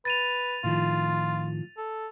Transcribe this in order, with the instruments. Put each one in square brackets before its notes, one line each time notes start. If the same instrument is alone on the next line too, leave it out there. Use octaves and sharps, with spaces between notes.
[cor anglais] B4 [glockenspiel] A6 D#7 F7
[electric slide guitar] A2 D#3 F3 [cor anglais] F4
[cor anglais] A4